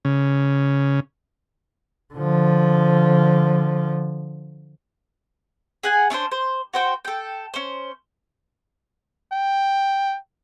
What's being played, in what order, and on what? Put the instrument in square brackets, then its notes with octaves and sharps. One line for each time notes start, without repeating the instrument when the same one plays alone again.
[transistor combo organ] C#3
[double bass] D3 F3
[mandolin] G#4 F#5 G#5
C#4 D4 A4 C5
C5
F#4 C5 G5
A4 G5
C#4 C5
[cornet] G5